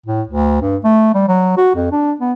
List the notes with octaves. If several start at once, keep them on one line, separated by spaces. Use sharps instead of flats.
A2
D2
G2
A3
G3
F#3
F#4
F2
D4
B3